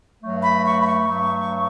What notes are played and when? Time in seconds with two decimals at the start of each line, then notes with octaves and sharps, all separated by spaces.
0.23 G2 F#3 A3
0.43 B5
0.66 C#6
0.82 B5
0.88 C#6
1.08 G2 F#3 A3